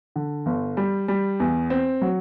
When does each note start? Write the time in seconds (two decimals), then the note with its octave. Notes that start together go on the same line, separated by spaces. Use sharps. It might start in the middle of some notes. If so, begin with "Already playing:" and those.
0.16 D3
0.46 G1
0.77 G3
1.08 G3
1.40 E2
1.70 C4
2.01 F#3